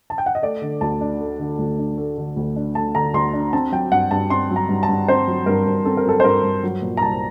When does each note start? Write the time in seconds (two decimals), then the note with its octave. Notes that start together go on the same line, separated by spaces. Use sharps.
0.10 A5
0.18 G5
0.26 F#5
0.35 D#5
0.42 A3 D5
0.62 D3
0.81 D2 A5
1.01 D4
1.21 A3
1.39 D3
1.59 D2
1.79 D4
1.98 A3
2.18 D3
2.37 D2
2.56 D4
2.75 A3 A5
2.95 D3 A#5
3.14 D2 C6
3.33 D4
3.53 C4 A5
3.72 F#3 G5
3.92 G2 F#5
4.11 G2 A5
4.30 C4 C6
4.51 F#3
4.56 A#5
4.69 G2
4.83 A5
4.89 G2
5.08 C4 C5
5.27 F#3
5.46 G2 A#4
5.66 G2
5.85 C4 A4
5.97 A#4
6.05 F#3 A4
6.20 C5
6.24 G2 A#4
6.43 G2
6.63 F#3
6.82 A#2
6.97 A#5
7.01 C2 A5